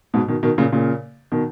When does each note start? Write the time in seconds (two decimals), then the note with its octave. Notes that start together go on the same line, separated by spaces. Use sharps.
0.14 G#2 B2
0.28 B2 D#3
0.43 B2 D#3
0.58 A#2 C#3
0.72 A#2 C#3
1.32 B2 D#3